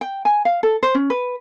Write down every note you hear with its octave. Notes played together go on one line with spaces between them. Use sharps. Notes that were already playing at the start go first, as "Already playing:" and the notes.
G5
G#5
F5
A4
C5
C#4
B4